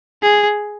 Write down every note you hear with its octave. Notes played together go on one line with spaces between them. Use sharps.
G#4